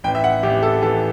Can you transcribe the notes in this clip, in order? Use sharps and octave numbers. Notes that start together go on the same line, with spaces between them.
A1 G5
E5
F#5
A1 G4
A4
E3 A4